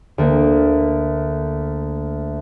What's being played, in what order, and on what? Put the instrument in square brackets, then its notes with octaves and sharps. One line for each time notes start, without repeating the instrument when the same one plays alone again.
[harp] D2 A#3